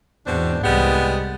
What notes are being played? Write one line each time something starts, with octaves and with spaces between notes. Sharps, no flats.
E2 G#2 B2 C4 D4
C2 G3 G#3 B3